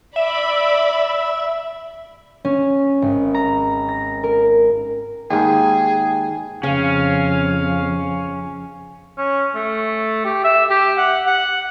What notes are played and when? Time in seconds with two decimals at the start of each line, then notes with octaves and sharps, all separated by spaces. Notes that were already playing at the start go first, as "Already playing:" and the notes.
0.16 D5 E5 B5
2.45 C#4
3.02 G#1
3.35 A#5
3.89 A#6
4.24 A#4
5.30 D#2 G#2 G#4 G5
6.63 F2 C#3 C#4 F5
9.18 C#4
9.55 A3
10.25 G4
10.44 E5
10.70 G4
10.98 F#5
11.27 F#5